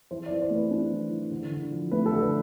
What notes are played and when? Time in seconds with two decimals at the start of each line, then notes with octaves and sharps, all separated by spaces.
0.11 E3 C5
0.26 E3 D5
0.42 C5
0.50 A3
0.55 B4
0.71 D4
0.91 E3
1.10 E3
1.31 D3
1.52 D3
1.72 F3
1.91 A3 B4
2.06 A4
2.12 D3
2.21 B4